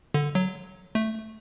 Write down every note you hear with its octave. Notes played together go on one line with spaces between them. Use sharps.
D3
F#3
A3